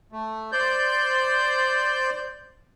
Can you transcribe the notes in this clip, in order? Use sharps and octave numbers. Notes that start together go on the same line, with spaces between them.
A3
C5 D5 G6